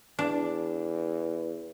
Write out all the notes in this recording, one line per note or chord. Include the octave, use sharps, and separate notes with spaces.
E2 D4